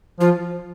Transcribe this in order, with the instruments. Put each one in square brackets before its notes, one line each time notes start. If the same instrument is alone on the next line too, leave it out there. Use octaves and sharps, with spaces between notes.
[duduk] F3 [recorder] F4